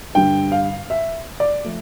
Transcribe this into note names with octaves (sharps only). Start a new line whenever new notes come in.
G2 D3 G3 G5
F5
E5
D5
F3 A3